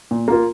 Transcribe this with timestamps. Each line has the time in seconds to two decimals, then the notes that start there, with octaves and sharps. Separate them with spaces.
0.11 A#2
0.28 A#3 F4 A#4